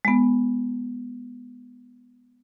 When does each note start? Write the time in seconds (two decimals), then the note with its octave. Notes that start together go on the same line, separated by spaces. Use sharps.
0.05 G#3 B3